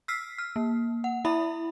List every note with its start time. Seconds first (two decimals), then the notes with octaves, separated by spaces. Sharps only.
0.08 E6 F6 B6 C7
0.38 F6
0.56 A#3
1.04 F#5
1.25 E4 E5 B5